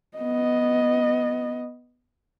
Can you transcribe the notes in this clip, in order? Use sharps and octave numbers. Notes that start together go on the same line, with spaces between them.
B3 D#5